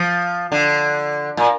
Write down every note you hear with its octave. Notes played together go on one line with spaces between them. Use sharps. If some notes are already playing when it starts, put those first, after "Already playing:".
Already playing: F3
D3
A#2